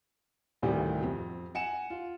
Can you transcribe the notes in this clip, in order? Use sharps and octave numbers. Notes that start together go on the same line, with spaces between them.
A1 D2 A2 C3 D#3 G3
F2 C4
F#5 G#5 C#7 E7
F4